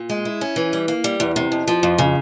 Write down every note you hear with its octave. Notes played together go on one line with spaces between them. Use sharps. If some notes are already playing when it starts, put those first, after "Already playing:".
Already playing: A#2
G#3
E4
C#4
E3
G3
A#3
G3
E2
C3
F2
F3
F2
C#3